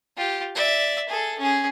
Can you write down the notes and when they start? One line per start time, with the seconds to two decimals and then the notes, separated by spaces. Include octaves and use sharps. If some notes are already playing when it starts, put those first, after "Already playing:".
0.17 F4 G4
0.55 D5 E5
1.09 G#4 A4
1.39 C#4 G#4